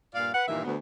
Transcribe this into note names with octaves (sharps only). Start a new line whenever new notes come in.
G2 A#2 D5 F5
B4 F#5
G2 A#2 D#3 E3 A#3 E5
D2 B3